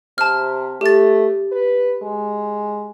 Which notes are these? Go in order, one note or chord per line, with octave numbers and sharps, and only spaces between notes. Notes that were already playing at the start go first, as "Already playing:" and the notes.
C3 A5 F6
A3 G4 A6
B4
G#3